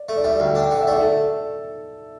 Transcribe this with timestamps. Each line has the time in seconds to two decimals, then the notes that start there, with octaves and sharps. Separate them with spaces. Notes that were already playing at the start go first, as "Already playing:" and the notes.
Already playing: D5
0.09 A3
0.17 D5
0.24 G3 E5
0.40 D2
0.46 G5
0.55 D4
0.71 D3
0.81 E5
0.87 A3 D5
0.97 A4